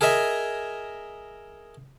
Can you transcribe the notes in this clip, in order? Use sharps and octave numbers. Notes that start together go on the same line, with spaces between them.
G#4 A#4 D#5 E5 G#5